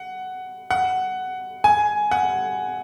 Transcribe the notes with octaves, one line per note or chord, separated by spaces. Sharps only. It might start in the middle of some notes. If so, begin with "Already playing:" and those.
Already playing: F#5
F#5
G#5
F#5